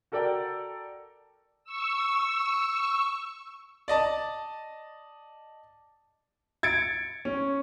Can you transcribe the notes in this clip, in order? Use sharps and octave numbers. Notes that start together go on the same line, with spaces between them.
F#4 A4 A#4 D5 G5
C#6 E6
D5 D#5 A5
G#6 A6 C#7 D7
C#4